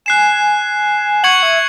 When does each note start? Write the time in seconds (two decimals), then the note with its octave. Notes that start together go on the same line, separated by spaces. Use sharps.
0.06 G#5 F#6 C7 E7
1.23 F#5 C#6 G#6 C#7 F#7
1.43 E5